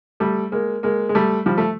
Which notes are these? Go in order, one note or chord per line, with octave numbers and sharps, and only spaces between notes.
G3 A3
G#3 A#3
G#3 A#3
G#3
G3 A3
F3 G3
A3